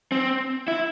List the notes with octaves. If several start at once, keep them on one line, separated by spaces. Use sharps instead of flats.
C4
E4